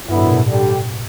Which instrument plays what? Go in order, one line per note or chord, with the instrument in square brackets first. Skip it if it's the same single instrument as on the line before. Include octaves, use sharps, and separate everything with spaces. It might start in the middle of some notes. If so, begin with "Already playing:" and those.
[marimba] G2 [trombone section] D3 F#3 B3 E4
[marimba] A2
B2
A2
[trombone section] D3 G3 D4 G4